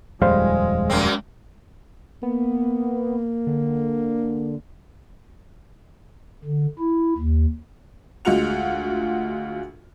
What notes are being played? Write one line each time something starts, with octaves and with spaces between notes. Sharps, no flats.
D#1 F2 G3 G#3 C5 F5
F#2 A#3 C4
A#3 B3
D3
D3
E4
D#2
D2 G#3 F4 F#4 F#5 F7